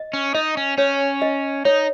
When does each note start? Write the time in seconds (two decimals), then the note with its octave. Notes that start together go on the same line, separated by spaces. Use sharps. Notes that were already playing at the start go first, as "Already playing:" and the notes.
Already playing: D#5
0.13 C#4
0.35 D#4 D#5
0.57 C#4
0.78 C#4 C#5
1.22 D#5
1.65 D#4 C#5